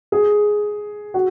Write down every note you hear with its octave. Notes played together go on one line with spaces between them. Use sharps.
G#4
F#4